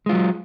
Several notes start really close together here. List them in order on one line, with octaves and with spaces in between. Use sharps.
G#3 F4 F#3